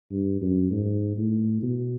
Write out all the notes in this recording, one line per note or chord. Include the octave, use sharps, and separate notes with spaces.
G2
F#2
G#2
A2
B2